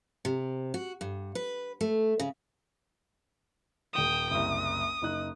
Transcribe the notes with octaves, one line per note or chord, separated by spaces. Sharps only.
C3
F#4
G2
B4
A3
C#3
D#1 G5 D#6 E7
F#1 C2 D#6
F#1 D#4 F#6